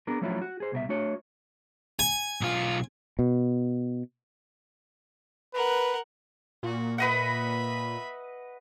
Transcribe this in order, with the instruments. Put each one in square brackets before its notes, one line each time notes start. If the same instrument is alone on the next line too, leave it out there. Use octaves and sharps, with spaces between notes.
[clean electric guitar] B3 D4 G#4 A#4
F3 F#3 A3 C#4 E4 F#4
F#4
G#4 C5
C2 B2 A#4 E5
A3 D4 F#4 C#5
[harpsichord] G#5
[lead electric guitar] B1 F4
[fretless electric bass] B2
[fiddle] A#4 F#5 [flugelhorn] B4
[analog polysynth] A#2 [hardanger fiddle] F#4
[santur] B4 D#5 F#5 [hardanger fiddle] E5 B5